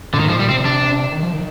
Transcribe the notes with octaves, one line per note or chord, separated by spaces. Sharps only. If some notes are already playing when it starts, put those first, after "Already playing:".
A#2 D3
G#2 D#3
F3
A#2
G3
C3 C4
D4
D#3
F3
D#3